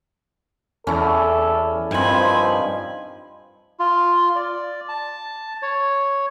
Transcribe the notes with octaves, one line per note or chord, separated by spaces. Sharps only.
E2 C#4 E4 A4 D5
G2 D#3 F3 C4 G#5 B5
F4
D5
A5
C#5